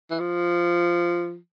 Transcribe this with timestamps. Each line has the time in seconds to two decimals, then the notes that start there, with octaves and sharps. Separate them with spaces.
0.10 E3
0.19 F3